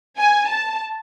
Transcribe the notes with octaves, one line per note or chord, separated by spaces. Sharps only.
G#5
A5